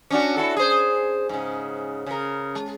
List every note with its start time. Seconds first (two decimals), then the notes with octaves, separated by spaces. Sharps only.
0.10 C#4 D4 F#4
0.36 E4 F#4 A4
0.57 G#4 C5
1.29 G#2 C#3
2.06 C#3 A#4
2.55 G#3